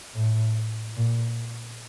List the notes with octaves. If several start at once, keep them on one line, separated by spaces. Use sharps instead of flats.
A2
A#2